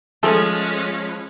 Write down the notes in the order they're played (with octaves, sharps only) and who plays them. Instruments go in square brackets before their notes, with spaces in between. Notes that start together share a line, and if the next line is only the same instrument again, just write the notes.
[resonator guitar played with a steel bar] F3 [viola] G#3 C#4 [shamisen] A3 G#4 A4